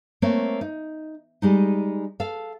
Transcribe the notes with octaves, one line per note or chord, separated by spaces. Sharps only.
A3 A#3 C4 C#5
D#4
G3 G#3 D#4
A4 F5